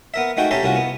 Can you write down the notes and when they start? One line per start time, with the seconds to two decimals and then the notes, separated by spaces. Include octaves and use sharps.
0.14 B3 A#4 E5
0.37 G#3 A3 D#4 F#4 G5
0.51 C#4 G4 A4 E5 A#5 C6
0.63 C2 C#4 F4 F#4
0.75 B3